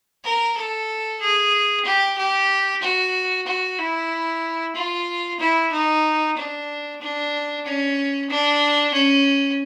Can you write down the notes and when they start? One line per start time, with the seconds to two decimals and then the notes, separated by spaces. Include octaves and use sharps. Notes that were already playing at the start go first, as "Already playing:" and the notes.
0.24 A#4
0.57 A4
1.21 G#4
1.85 G4
2.18 G4
2.82 F#4
3.46 F#4
3.78 E4
4.75 F4
5.40 E4
5.72 D#4
6.36 D4
7.01 D4
7.65 C#4
8.30 D4
8.94 C#4